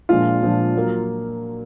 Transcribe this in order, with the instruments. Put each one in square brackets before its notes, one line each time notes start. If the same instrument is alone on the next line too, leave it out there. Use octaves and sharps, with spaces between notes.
[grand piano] A#2 F3 G#3 D4 [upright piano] F4
[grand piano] A#2 F3 G#3 D4
F#3 A#3